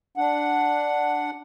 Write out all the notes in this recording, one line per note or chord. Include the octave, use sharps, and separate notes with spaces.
D4 F#5